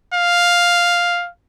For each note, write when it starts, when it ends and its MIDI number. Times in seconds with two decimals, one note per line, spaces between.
0.14 1.28 77